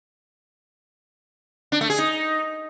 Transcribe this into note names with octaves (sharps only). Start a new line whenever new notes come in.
D4
A3
G#4
D#4